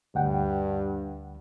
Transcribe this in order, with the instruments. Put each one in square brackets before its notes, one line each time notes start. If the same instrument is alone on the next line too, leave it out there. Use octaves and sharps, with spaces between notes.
[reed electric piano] D2 F#5 G5 [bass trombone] G2